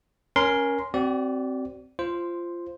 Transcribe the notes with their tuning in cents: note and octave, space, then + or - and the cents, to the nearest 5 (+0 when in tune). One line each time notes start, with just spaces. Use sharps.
C#4 +0 A#4 +20 C6 -10
C4 +0 F#4 +40 D5 -15
F4 -15 C5 +0